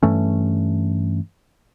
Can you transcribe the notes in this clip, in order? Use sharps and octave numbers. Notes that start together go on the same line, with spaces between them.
G2 E3 A3 C#4